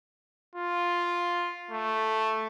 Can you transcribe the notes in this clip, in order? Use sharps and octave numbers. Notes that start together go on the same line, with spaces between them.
F4
A3